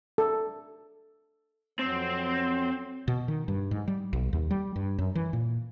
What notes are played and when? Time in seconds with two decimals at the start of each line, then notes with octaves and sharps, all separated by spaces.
0.18 A4
1.79 F2 F#3 C4
3.08 B2
3.28 D#3
3.48 G2
3.71 G#2
3.88 G3
4.13 B1
4.33 D#2
4.51 G3
4.76 G2
4.98 F#2
5.15 E3
5.33 A#2